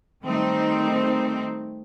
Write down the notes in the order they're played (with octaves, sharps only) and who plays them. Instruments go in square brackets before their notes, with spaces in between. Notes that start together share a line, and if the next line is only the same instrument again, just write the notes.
[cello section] D#3 G3 A3 C4 D#4